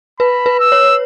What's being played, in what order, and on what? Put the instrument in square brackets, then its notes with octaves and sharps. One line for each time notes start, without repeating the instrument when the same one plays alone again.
[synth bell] B4 [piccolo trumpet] B5
[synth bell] B4
[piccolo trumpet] E6
[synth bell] C#5